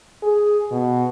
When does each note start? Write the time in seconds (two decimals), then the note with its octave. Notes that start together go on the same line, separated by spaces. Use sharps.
0.23 G#4
0.71 B2